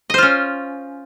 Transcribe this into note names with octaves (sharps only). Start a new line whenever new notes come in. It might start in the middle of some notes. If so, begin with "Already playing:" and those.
C#4 F4 C5 D#5